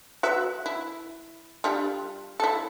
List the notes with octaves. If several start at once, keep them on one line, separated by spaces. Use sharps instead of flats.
F#4 B4 E5
E4
G3 D4 F4
E4 A4